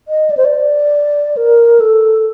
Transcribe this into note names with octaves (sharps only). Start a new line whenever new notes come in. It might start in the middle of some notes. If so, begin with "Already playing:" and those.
D#5
D5
C5
D5
A#4
A4